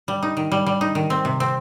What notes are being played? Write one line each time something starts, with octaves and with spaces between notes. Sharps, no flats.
G3
D#4
D#3
G3
G3
D#4
D#3
C4
C3
C4